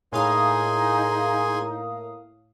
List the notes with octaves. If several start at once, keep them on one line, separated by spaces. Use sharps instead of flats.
A2 A#3 D#4 G#4 F5 G#5 C6 D#6